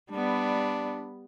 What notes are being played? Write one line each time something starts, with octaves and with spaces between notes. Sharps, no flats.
G3 B3 D4